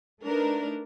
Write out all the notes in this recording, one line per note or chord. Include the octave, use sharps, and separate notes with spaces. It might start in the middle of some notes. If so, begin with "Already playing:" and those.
A3 D4 D#4 A#4 B4